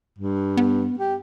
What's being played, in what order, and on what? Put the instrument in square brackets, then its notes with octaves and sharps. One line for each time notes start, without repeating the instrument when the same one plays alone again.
[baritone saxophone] G2
[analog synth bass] B3
[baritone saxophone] G4